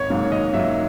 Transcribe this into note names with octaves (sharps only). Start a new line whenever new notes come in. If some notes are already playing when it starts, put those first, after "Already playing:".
Already playing: G#1 C#5
G#2 F#3 A#3
G#1 D#5
G#2 F#3 A#3 E5